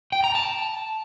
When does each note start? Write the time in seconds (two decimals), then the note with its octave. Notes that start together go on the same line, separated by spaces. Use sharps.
0.12 G5
0.24 A#5
0.35 A5